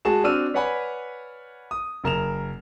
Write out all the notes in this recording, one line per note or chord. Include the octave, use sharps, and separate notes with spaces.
G#3 F#4 G#4 A5 E7
C4 D4 F#4 E6 F6 D#7
B4 C#5 D5 F#5 G#5 B5
D#6
F#1 A#4 E7 F7